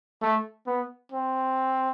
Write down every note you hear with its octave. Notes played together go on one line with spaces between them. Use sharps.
A3
B3
C4